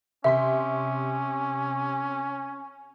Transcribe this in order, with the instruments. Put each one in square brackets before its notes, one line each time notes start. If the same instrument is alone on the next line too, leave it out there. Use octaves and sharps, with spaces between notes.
[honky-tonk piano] C3 C6 B6 [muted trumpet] C#4 [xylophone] E5